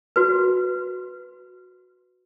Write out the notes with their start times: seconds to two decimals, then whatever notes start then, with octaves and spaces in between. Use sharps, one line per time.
0.16 F#4 B4